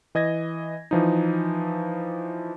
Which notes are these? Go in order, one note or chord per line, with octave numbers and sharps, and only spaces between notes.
E3 D#5 G#6 A#6
E3 F3 D#4